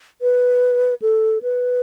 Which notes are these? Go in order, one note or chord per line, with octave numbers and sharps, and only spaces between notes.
B4
A4
B4